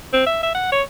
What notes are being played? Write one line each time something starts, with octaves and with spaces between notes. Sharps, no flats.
C4
E5
E5
F#5
C#5